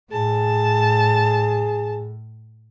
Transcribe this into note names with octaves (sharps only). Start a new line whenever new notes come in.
A2 G#4 A5